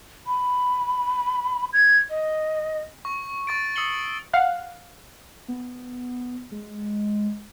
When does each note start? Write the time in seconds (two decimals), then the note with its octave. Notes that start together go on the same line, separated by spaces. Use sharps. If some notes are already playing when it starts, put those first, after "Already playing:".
0.27 B5
1.73 G#6
2.10 D#5
3.05 C#6
3.47 C#6 A6 D7
3.76 D#6 E6 C7 C#7 F#7 G7
4.33 F5 F#5
5.48 B3
6.51 G#3